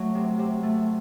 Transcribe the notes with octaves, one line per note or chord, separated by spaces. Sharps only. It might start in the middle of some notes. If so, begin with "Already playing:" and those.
Already playing: F#3 A3
C3
C3
A3